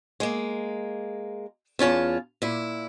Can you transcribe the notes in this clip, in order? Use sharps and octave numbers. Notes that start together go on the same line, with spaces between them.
G#3 A#3
E2 C#4 F4 A5
A#2 E4